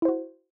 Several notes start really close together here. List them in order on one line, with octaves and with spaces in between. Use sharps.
E4 C5 F#4